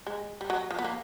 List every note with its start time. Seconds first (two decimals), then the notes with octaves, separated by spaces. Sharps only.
0.07 G#3
0.41 G3
0.50 F#3
0.71 F3
0.79 B3
0.85 A#3